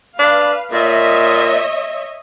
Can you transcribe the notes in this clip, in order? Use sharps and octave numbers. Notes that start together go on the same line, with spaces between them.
D4 B4 F5
A#2 C#5 D#5 E5